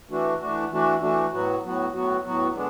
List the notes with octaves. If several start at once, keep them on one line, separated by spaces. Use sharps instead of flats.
E3 A3 D4 F#4
E3 A3 D4 F#4
E3 A3 D4 F#4
E3 A3 D4 F#4
A2 F#3 B3 F#4
A2 F#3 B3 F#4
A2 F#3 B3 F#4
A2 F#3 B3 F#4
D3 G#3 B3 D4